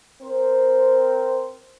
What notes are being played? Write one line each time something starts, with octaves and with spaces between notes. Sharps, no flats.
C4 A#4 C5